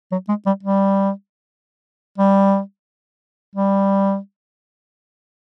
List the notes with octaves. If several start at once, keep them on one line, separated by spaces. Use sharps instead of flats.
F#3
G#3
G3
G3
G3
G3